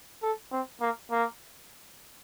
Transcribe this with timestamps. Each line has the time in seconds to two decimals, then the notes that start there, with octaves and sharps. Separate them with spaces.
0.23 A4
0.52 C4
0.81 A#3
1.11 A#3